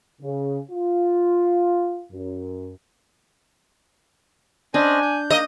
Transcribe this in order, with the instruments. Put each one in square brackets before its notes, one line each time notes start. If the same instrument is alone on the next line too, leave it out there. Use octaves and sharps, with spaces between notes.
[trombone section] C#3
F4
F#2
[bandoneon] C#4 C5 D#5 [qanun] D4 [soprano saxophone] G#5
[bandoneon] G6
[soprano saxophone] A#3 [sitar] D#5